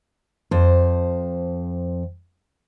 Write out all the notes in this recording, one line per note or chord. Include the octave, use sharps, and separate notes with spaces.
F2 C5